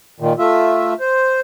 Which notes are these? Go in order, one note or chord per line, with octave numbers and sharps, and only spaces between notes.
A#2 D#3
A3 F4 E5
C5